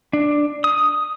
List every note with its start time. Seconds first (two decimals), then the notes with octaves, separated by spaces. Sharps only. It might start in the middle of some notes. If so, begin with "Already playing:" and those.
0.13 D4
0.64 D#6